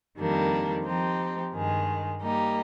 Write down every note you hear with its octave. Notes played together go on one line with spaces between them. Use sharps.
F2 D#3 G3 A#3 D4
F3 C4 D#4 G4
G2 D#3 G#3
G3 A#3 D#4 G4